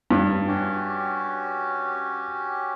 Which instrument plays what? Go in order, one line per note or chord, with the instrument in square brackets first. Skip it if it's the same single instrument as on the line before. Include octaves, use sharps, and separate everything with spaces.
[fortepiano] G2
[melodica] C#4 F#4 G4